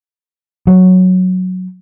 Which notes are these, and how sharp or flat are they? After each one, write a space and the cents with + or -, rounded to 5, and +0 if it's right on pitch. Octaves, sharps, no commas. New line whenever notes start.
F#3 -5